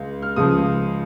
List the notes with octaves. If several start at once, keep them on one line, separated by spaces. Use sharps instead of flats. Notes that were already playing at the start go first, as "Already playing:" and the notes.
Already playing: C#2
F6
C#2 C#3 F3 D#6